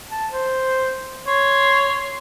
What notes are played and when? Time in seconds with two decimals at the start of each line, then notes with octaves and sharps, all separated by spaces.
0.11 A5
0.31 C5
1.27 C#5 C6